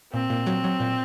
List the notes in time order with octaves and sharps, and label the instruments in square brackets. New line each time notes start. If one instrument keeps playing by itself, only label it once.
[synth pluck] A#2 [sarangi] C4
[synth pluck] A#2
F#3
F#3
A#2